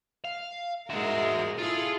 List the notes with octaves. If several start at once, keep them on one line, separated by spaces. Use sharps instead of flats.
F5
G#2 G#3 F#4 A#4 E5
E4 F4 G#4 A4